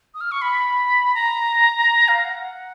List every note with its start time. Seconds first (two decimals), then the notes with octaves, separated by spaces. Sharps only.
0.14 D#6
0.21 F6
0.31 C#6
0.42 B5
1.15 A#5
2.08 F5
2.24 F#5
2.40 F#5